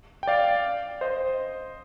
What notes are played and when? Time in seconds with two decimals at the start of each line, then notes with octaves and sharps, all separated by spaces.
0.23 G5
0.27 D5 F5
1.01 C5 D#5